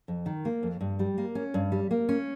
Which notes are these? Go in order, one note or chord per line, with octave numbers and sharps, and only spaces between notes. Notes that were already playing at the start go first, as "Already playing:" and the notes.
F2
D#3
A#3
F2
G2
G3
A#3
C#4
G2
G3
A#3
C#4